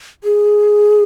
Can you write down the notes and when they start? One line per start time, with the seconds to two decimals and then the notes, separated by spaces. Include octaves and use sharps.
0.24 G#4